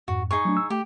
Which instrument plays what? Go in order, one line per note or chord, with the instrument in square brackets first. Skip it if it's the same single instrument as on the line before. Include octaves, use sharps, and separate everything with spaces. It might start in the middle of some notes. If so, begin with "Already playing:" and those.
[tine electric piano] F2 G#2 [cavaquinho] F#4
[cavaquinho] D#4 G#4 C#6
[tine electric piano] F#3 A3 D4
E6
[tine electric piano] A3 [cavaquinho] G4